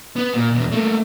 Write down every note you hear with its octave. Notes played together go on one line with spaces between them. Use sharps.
B3
A#2
E2 B2
A3 A#3